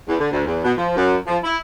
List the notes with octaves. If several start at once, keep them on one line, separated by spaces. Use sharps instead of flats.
E2
D3
D2
E2
B2
F3
F#2
F3
E4